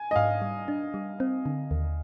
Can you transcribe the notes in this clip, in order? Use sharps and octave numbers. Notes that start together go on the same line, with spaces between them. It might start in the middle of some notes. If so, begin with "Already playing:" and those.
Already playing: G#5
D#5
G#2 F5
G3
D4
G3
C4
D3
D#2